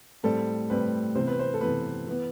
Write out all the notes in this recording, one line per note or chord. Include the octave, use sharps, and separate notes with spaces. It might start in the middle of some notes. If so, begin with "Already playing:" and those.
A2 G3 C4 A4
A2 G3 C4 B4
C3 E3 B3 C5
B4
C5
A4
C3 E3 B3 B4
E3 B3